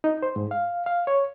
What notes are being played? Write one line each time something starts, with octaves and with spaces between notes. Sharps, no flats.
D#4
C5
G#2
F5
F5
C#5